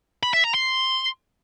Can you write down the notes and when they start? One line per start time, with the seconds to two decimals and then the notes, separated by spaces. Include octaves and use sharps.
0.23 B5
0.34 E5
0.44 A#5
0.55 C6